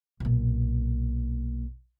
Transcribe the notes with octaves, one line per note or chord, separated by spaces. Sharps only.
B1 A#2